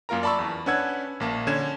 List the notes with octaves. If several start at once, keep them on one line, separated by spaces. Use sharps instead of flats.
F#2 A#3 F4 A#4 A#5
D5 A5 B5 C#6 E6
E2
C#4 D4 B4 F#5 E6 G#6
A#1 A#3 A5
D3 C#4 G#6 E7